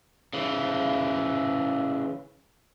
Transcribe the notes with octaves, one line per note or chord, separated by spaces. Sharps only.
C#3 E3